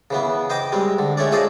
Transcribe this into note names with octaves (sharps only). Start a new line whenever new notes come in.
C#3 E3 B3
C5 D#5 G5 D6
G3 G#3 C4
D3
G#3 A3 C#4 C#5 D5
F4 G#4 A4 C5 D5 D#5